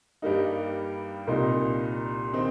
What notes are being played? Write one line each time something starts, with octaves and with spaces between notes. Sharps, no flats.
G2 G3 A#3 D#4
C2 A#2 A#3 D#4
D#3 C4 D#4